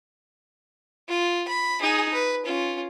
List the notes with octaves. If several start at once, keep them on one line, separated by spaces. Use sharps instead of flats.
F4
B5
D#4 G#4
B4
C#4 F4